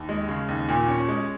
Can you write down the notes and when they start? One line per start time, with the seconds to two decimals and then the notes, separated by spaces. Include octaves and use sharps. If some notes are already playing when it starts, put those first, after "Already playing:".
Already playing: D#2
0.09 G#3
0.29 C#3
0.48 D#2
0.69 A#2
0.88 C#4
1.08 G#3